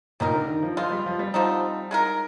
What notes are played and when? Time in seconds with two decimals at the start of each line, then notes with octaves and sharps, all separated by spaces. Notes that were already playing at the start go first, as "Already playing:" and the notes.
0.20 A#2 G3 A#3 D#4 A#4
0.35 D3
0.49 D#3
0.63 F3
0.77 F3 G#3 C4 F4
0.91 G3
1.06 F3
1.19 G3
1.34 D3 F3 C4 D#4
1.91 G#3 D#4 A#4